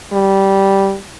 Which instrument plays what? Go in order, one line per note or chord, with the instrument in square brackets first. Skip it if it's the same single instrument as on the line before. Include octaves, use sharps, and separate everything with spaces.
[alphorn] G3